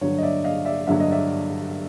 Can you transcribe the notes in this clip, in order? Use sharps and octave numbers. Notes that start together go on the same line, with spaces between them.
G2 D3 F#3 C#5
D#5
D5 E5
D#5 F5
D5 E5
G2 D3 F#3 E5
D#5
D5 E5